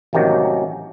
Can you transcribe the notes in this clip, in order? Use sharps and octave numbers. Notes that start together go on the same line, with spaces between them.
A1 C3 D#3 F#3 A#3